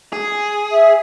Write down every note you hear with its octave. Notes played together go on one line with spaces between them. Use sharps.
G#4
E5